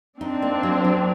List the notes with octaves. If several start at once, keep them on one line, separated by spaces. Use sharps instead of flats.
C4 D4 D#4
A#3
F#3
F#3